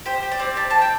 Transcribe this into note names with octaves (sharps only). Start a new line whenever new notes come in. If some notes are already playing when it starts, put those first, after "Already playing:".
G4 C5
G4
D5
C4
G4 A5
C4 A5
G5